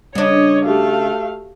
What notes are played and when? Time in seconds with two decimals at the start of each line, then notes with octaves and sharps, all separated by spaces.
0.15 C#3 G3 D4 C#5 D#5
0.65 A3 F#4 G4 F5